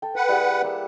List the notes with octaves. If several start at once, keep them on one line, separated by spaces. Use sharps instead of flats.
A4 G5
B4 F#5
G3 E4 G#4
A#3 G4 E6